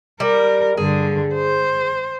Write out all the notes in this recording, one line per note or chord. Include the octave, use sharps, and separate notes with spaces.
G3 A#4
G2 D3 G#4
C5